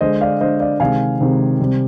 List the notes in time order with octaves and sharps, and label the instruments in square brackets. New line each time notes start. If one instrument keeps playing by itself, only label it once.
[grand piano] D3 G#3 C5 D#5
D5 F5
D3 G#3 C5 D#5
D5 F5
C3 D#3 G#3 F5 G#5
C3 D#3 G#3
C3 G3